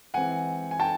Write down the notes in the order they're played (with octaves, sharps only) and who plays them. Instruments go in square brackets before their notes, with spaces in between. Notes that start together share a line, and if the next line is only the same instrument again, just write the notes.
[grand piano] E3 G#3 C4 F#5 G#5
G#5
G5 A5